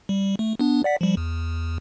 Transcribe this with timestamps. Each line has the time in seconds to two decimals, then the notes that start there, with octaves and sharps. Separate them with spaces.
0.09 G3
0.39 A3
0.60 B3 D4
0.84 D5 F#5 B6
1.01 F3 G3
1.17 E2